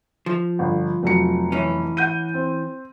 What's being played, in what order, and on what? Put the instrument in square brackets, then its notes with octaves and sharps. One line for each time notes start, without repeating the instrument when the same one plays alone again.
[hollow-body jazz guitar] F3
[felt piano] G1
F1 F#3 C#7
[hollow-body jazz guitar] E3 C#4
[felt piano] F#5 G6 D#7
C4